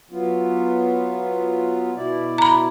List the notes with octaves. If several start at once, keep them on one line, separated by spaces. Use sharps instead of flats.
F#3 B3 F4
B2 E4 D5
A#5 B5